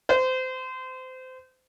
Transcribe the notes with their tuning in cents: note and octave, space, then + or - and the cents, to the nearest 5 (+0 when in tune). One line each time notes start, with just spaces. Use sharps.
C5 -25